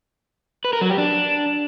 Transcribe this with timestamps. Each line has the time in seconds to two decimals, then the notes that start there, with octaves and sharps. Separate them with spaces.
0.65 B4
0.73 A#4
0.81 F#3
0.90 G4
0.98 D4